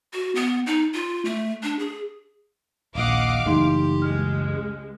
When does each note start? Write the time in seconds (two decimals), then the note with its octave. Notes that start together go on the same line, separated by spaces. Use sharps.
0.13 F#4
0.35 B3
0.67 D#4
0.94 F4
1.25 A3
1.63 D4
1.79 G#4
2.95 D#1 A#1 D#5 F5 F#5 D6
3.46 F#1 E3 A3 D#4 G4 C6
4.02 C#2 G#3 F6